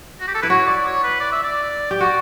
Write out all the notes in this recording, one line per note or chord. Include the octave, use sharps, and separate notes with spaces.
F#4
G4
A4
E4 B4
F#4 C#5
D5
C#5
B4
D5
E5
D5
G4 D5
F#4